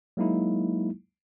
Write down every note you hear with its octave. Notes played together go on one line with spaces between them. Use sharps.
F#3 G#3 A#3 D#4 E4